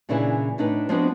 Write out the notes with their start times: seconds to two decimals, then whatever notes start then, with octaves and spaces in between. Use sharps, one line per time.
0.09 A#2 C#3 E3 D4 E4 G#4
0.58 A2 D4 D#4 B4
0.89 F3 G#3 B3 C4 D4 F#4